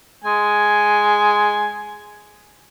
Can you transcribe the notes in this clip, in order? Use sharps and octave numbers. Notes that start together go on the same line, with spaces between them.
G#3 G#5